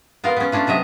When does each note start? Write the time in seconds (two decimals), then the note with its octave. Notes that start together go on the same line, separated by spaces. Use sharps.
0.24 B3 F4 A#4 F5
0.36 B3 C#4
0.52 A3 C#4 D4 F4
0.67 C3 F#3 D#5 E5